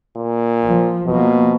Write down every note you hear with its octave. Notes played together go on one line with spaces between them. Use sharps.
A#2
F3
B2 F3 A#3